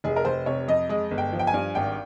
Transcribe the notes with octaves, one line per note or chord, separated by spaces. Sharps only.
F1 G#4
A#4
F1 C5
C3 C#5
F2 D#5
G#3 D#5
G1
G5
F3
G5
G#5
G2
G#1 G5